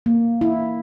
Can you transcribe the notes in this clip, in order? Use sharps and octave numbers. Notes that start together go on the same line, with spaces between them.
A#3
E4